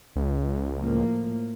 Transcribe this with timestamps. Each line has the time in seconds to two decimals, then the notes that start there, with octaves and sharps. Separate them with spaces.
0.16 C#2
0.81 A2 F3 A#3